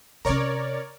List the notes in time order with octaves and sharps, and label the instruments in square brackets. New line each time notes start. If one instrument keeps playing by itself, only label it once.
[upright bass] C3 C#4 [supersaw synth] A#4 C#5 D5